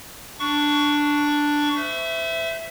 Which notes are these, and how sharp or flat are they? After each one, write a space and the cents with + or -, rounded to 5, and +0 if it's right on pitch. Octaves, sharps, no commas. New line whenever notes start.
D4 +0 C#6 +15
C5 -40 E5 +0